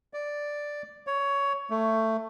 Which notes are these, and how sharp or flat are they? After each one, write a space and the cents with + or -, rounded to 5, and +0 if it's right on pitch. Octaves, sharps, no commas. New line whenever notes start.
D5 +0
C#5 +15
A3 +15